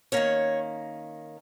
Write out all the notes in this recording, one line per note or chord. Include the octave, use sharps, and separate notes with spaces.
D#3 A#3 C#4 C#5